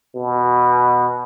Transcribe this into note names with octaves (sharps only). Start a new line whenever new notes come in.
B2